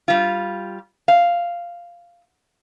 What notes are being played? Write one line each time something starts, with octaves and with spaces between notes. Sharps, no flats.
G3 F4
F5